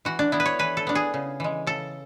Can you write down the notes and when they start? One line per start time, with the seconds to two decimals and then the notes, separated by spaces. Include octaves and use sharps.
0.05 E3 F#4
0.19 D4
0.32 B3 D4 E4
0.40 B4
0.46 C#5
0.59 E3 B4
0.77 A4
0.87 B3 D4
0.95 G#4
1.14 C#3
1.40 E3 G#3
1.67 C#3 A4